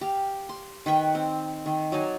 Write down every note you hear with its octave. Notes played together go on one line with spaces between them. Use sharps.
G4 F5
C6
D#3 B4 G5 C#6
C4
D#3
F#3 D#4 D5 G#5